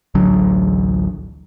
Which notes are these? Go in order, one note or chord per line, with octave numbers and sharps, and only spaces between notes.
A1 D2 F#3 D4